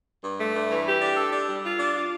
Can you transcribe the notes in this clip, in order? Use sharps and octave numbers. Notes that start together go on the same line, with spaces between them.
G2
A3
G2
E3
G4
D4
A4
D4
G3
F4
D4
F4